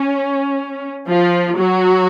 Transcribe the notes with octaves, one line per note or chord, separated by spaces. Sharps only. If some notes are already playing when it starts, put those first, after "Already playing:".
Already playing: C#4
F3 F4
F#3 F#4